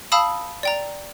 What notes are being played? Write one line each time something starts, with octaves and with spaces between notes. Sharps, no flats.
F5 A5 B5 D#6 E6
D5 G5 A#5